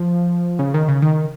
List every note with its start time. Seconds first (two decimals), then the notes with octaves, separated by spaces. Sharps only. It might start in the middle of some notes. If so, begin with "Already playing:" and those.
Already playing: F3
0.59 C#3
0.74 D#3
0.88 C#3
1.02 D#3